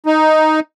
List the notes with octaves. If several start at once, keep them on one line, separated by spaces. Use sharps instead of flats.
D#4